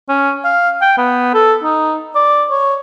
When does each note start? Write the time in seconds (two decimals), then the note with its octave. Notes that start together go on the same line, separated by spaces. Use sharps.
0.09 C#4
0.44 F5
0.81 G5
0.97 B3
1.34 A4
1.63 D#4
2.15 D5
2.50 C#5